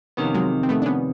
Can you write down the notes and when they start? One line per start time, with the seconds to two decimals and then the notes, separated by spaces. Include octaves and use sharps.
0.17 F2 C3 D#3 B3 C#4
0.34 F#3 G#3
0.63 C4
0.69 A3 B3
0.82 D4
0.86 B3 C#4